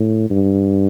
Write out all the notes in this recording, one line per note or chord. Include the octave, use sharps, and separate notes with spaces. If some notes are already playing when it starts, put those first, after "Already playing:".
Already playing: A2
G2